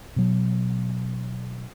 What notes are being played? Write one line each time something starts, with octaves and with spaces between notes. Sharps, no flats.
B2 F#3